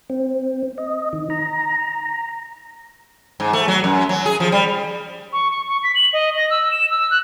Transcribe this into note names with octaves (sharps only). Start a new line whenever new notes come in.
C4
D#5
D#3
A#5
G#2
A3
F#3
F#2
F#3
G#4
F3
G3
C#6
C#6
C#6
B6
F#7
D#5
A#6
E6
E7
E6
F#6